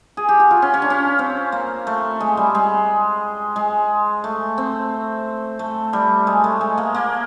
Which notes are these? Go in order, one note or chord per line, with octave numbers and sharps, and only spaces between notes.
G#4
G4
F#4
F4
C#4
C#4
D4
C#4
C4
A#3
A3
G#3
G3
G#3
G#3
A3
C4
A3
G3
G#3
A3
G#3
A#3
A#3